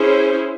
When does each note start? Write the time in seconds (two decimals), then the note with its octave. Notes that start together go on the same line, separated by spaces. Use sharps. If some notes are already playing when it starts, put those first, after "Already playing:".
Already playing: C#4 E4 G#4 C5